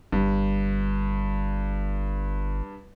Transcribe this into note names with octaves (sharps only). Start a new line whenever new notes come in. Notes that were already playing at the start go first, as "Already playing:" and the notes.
G1 G2